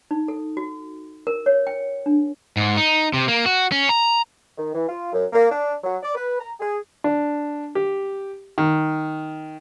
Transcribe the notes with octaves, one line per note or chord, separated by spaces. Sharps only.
D#4
A4
F#4
A#4
C#5
G5
D4
G#2
D#4
C3
A#3
F#4
C#4
A#5
D#3
E3
F4
F#2
A#3
D4
F#3
D5
B4
A#5
G#4
D4
G4
D#3